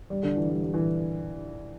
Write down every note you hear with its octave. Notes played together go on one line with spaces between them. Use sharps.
G3
D3
E3
G3
G3
E3